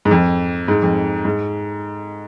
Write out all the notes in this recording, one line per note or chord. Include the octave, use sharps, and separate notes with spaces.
G#2
F2
G#2
F2
G#2